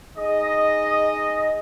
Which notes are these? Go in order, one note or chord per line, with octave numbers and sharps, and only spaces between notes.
D#4 G#4 D#5